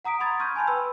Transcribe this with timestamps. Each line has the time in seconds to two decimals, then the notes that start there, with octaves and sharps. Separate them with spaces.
0.05 F#5 A#5 D#6 B6 D7
0.20 B5 C6 D#6 G#6 A6
0.40 C#6 F6 G6 G#6 D#7
0.56 G#5 A5 B5 C6
0.67 B4 G5 B5 E6